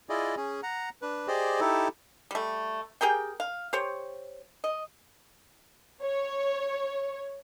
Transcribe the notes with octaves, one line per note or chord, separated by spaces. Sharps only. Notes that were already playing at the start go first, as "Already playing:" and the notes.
E4 F4 G#4 D5 D#5
C#4 G#4
F#5 A#5
D4 B4
G4 G#4 C5 D5 D#5
D#4 E4 G4 A4
G3 A3
G4 G#4 A#4 G5
F5
G4 C5 C#5
D#5
C#5